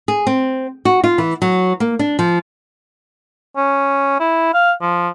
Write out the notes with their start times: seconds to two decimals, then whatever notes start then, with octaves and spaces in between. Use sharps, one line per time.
0.08 G#4
0.27 C4
0.85 F#4
1.04 F4
1.18 E3
1.42 F#3
1.80 A#3
1.99 D4
2.19 F3
3.57 C#4
4.20 E4
4.54 F5
4.82 F3